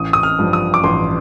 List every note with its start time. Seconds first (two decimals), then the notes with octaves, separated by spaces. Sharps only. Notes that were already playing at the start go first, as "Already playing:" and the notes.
Already playing: A1 D#6
0.13 D#6
0.23 F6
0.39 G2 F3
0.53 D#6
0.74 D6
0.84 A1 C6